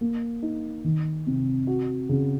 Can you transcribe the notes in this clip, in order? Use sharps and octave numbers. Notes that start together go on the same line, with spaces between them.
A#3
D#4
D#3
C3
F#4
C#3